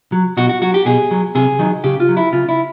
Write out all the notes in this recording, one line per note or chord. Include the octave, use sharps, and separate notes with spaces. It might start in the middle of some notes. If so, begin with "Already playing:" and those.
F#3
B2 F#4
F#4
F#3 F#4
G4
B2 G#4
F#3
C3 G#4
D#3 F#3
C#3 G4
F4
F#3
E4
C#3 F4
E4